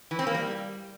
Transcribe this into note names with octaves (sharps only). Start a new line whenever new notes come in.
E3
C4
A#3
G3